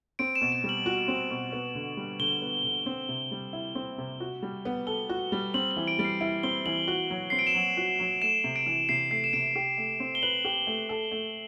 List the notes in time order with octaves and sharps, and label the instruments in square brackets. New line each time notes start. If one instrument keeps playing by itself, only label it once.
[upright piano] C4 [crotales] D7
[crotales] E7
[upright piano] B2
[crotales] E7
[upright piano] G3
[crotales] F#7
[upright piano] F#4
C4
B2
B3
D3
G3
[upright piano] D3 [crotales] G7
[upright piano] B3
D3
C4
C3
G3
E4
C4
C3
F#4
G3
B3
[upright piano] A4 [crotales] G7
[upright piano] F#4
G3
[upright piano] C4 [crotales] F#7
[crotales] F#7
[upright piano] E3
[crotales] D7
[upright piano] G3
[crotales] C7
[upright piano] E4 [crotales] D7
[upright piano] C4 [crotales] G7
[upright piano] E3 [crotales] F#7
[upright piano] F#4
F#3
[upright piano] C4 [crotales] C7
[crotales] D7
E7
[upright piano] F#3 [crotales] F#7
[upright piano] F#4
F#3
[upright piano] A3 [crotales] E7
[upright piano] C3
[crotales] D7
[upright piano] E3
[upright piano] C3 [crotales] C7
[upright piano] A3 [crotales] C7
[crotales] E7
[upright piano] C3 [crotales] D7
[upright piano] G4
A3
C4
[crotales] G7
[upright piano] B4 [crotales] F#7
[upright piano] G4
A3
A4
A3